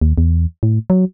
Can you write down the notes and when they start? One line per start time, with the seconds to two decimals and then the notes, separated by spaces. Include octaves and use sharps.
0.01 D#2
0.18 E2
0.63 A2
0.90 F#3